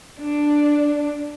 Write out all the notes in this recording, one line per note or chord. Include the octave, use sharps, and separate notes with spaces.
D4